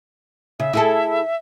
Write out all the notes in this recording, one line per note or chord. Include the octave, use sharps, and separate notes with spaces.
C#3 E5
E4 G#4 A4